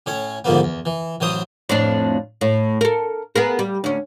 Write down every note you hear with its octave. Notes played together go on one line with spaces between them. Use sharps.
A2 C#4 C#5
G#2 D3 F3 A#3 B3
E2
E3
A1 E3 F#3 C5 D#6
F2 A2 D4
A2
A4 A#4
B3 G#4 A#4
G3
D2 C#4